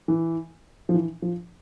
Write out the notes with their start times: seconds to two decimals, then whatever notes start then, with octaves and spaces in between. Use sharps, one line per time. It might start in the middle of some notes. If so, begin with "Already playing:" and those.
0.08 E3
0.89 F3
0.94 E3
1.22 F3